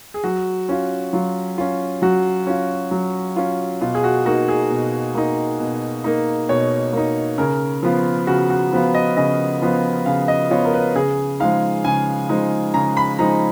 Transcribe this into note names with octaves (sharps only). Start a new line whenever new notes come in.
G#4
F#3 F#4
C#4 F4
F#3 F4
C#4 F4
F#3 F#4
C#4 F4
F#3
C#4 F4
B2 F4
G#4
F#4
A#3 D#4 F#4
G#4
B2
A#3 D#4
B2
A#3 D#4
B2 C#5
A#3 D#4
C#3 A#4
F3 B3 F4
C#3 F#4
F#4
F3 B3 F4
D#5
C#3 D#5
F3 B3 F4
C#3 F5
D#5
F3 B3 F4 C#5
A#4
B4
C#3 G#4
F3 G#3 D#4 F5
C#3 G#5
F3 G#3 D#4
C#3 A#5
B5
F3 G#3 D#4 A#5